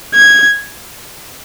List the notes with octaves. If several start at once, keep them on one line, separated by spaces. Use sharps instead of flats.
G#6